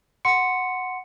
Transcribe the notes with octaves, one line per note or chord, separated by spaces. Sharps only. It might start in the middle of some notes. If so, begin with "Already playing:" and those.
F#5 C6 C#7